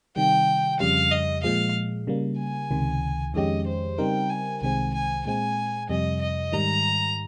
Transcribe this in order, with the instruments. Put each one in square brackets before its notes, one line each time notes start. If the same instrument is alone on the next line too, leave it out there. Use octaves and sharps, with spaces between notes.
[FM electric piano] C3 D#3 G3 [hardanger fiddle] G5
[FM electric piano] F2 C#3 G3 [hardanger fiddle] F5
[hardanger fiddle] D#5
[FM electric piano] A#2 F3 G#3 [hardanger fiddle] F5
[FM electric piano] C#3 G3 A#3
[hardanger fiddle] G#5
[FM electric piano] C#2 C3 D#3
[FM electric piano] F2 D#3 G#3 C#4 G4 [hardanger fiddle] D#5
[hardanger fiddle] C5
[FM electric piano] C#3 G3 C4 D#4 A#4 [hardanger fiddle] G5
[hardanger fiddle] G#5
[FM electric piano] C2 C3 D#3 G#3 C4 [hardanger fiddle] G#5
[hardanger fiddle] G#5
[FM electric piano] A#2 G#3 C4 [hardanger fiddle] G#5
[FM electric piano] F2 C3 G3 [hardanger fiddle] D#5
[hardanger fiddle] D#5
[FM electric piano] G#2 D#3 G3 [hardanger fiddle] A#5